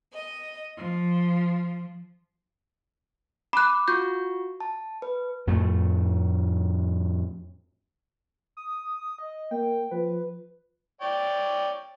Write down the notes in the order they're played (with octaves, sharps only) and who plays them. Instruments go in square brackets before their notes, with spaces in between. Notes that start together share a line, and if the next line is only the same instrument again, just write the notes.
[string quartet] D#5
F3
[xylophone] B5 F#6 [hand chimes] D6
[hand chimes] F4 F#4 C#6 [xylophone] G6
[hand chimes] A5
B4
[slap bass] F2 A2 A3
[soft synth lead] D#6
D#5
[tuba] A#3 [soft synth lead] G5
[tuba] F3 [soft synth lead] B4
[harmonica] C#5 D5 G5